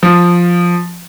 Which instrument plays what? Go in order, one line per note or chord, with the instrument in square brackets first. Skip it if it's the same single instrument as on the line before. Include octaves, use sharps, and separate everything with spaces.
[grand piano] F3